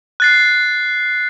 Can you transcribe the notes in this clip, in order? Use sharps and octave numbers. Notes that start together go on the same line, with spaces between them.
F#6 A6 C7